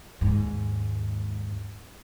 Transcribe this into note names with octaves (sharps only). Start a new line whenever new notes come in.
D#2 G#2